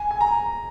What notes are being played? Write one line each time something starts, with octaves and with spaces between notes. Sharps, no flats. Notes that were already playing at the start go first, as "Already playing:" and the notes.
Already playing: G#5
G#5
A#5